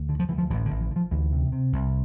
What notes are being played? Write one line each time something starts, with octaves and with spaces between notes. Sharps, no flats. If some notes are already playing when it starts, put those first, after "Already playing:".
Already playing: D2
D3
F3
D2 E3
F3
A1 E3
D3
A1
E3
D3
F3
D2 E3
C3
C3
C2